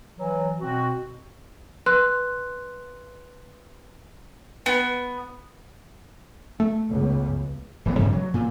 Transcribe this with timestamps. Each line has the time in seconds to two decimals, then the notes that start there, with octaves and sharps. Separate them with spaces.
0.17 E3 F#3
0.60 B2 C4 F#4
1.86 B4 C6 F#6
4.66 B3
6.60 A3
6.90 C#2 B3
7.85 D1 E3 B3
7.99 G2 C#3 E3 G3
8.13 F#3
8.34 A#2